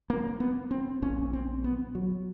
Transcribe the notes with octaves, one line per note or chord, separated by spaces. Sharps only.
A#3
B3
C4
A#1 A#2 C#4
C4
B3
F#3